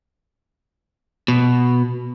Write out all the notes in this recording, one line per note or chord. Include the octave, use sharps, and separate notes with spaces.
B2